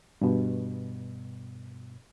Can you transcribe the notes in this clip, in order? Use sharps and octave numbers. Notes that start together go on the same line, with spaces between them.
G2 B2